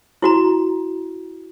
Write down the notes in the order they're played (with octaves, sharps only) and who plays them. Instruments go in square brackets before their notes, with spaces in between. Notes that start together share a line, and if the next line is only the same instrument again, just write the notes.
[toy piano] E4 F#4 A#5